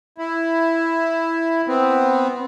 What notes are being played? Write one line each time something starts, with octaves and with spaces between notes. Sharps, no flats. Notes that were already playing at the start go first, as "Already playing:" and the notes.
E4
B3 C4